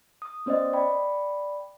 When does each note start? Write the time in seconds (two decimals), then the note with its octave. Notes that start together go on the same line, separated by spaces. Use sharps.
0.22 D#6
0.46 B3 C#4 C5 D5 D#5
0.73 D5 G5 B5